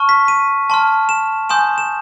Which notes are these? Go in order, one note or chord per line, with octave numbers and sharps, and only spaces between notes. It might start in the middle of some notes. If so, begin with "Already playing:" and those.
Already playing: A5 C#6 F6
B6
D#7
A5 C6 F6
E7
G#5 C6 D#6 G6 E7
E7